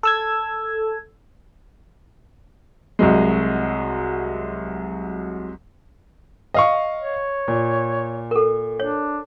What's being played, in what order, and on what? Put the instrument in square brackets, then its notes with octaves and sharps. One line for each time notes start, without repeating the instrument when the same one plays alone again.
[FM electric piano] A4 E6 G#6
[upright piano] C2 F#3 G#3
[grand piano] D#5 F5 C#6
[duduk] C#5
[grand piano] A#2
[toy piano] A4 A#4
[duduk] D4 [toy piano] C#5